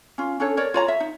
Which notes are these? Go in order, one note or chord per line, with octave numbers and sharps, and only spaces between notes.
C#4 F4
C#4 D4 A4 C#5
A#4 C#5 D5
F4 C#5 A#5
E5
D#4